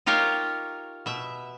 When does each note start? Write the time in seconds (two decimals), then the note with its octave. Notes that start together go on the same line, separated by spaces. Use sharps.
0.06 D#4 F4 G4 A#4 C#5
1.06 B2 E5